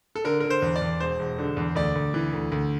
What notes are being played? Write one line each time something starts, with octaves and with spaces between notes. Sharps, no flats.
A4
D3 A#4
D3 A#4
C5
E2
D5
E2
E1 C5
E1
D3
E2
D2 D5
D2
E3
D2
D2